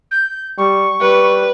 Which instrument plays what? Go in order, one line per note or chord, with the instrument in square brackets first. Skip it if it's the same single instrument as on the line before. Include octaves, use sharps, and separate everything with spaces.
[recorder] G6
[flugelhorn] G3 [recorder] C#6
[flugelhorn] G3 [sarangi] B4